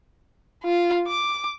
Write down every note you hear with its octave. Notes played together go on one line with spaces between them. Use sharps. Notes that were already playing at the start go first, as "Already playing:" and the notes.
F4
D6